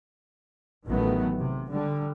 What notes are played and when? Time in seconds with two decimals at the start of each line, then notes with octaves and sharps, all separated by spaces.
0.86 A1 D#3 F#3 A3 B3
1.39 C3
1.70 D3 G3